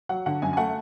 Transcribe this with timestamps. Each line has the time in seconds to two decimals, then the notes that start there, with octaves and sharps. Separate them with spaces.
0.09 F#3 F#5
0.26 D3 F#5
0.42 F#2 G#5
0.53 G#5
0.57 A3 F#5